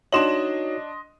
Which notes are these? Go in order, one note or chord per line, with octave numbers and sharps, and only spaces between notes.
D4 D#4 F#4 C#5 D#5 C6 E7 F#7